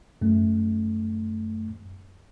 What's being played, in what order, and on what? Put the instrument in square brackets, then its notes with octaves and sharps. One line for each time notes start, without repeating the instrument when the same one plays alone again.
[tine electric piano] F#2 A3